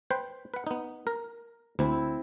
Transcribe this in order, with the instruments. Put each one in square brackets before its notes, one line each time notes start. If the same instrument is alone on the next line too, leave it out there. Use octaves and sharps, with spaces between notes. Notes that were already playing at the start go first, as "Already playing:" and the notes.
[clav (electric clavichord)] B4 C5 G5
B4 F#5
B3 D#4
A#4
[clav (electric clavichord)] D2 [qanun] C4 E4